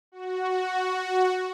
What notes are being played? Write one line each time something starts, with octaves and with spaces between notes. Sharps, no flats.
F#4